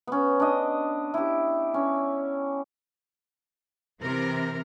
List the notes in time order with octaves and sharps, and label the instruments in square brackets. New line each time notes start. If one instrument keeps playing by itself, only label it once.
[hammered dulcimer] B3 C#4
D4 D#5
E4 G4
C#4
[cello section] C3 E3 A#4